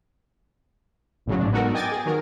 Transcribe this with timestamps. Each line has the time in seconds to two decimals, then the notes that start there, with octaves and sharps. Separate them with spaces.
1.26 G#1 A2 C#3 F#3
1.39 G#2 D4
1.52 B3 D#4 F#4 A4 A#4
1.74 D#5 G5 G#5 D6 A6
1.91 G#4
2.05 D#3 F#3 A#4